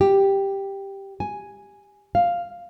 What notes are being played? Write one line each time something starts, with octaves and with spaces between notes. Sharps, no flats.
G4
G#5
F5